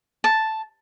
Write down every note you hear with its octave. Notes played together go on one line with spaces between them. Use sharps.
A5